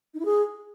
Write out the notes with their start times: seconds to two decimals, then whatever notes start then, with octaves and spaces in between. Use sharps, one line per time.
0.14 D#4
0.20 E4
0.25 G#4